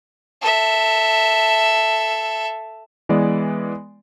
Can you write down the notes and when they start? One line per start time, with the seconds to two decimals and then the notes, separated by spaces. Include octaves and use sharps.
0.42 A4 E5
3.09 E3 G#3 B3 D5